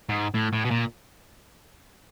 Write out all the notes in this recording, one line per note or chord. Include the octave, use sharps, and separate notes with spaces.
G#2
A2
A2
B2
A#2